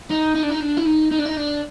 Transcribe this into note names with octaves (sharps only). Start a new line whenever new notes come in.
D#4
D#4
D4
D#4
D4
E4
D#4
D#4
D4
D#4
D4